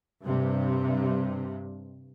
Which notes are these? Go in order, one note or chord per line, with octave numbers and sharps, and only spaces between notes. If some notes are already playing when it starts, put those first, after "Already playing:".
G2 C3